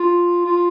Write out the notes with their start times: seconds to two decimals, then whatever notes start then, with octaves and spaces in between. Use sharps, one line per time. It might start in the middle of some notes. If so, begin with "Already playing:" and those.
Already playing: F4
0.45 F4